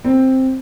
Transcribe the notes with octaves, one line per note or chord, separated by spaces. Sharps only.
C4